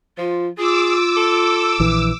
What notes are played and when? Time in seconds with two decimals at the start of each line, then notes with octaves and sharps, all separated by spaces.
0.18 F3 F4
0.58 F4 G#4 D6 E6
1.17 A4
1.80 A#1 E3